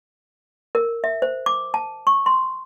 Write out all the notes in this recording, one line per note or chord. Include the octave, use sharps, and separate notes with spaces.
A#4
E5
C5
D6
A5
C#6
C6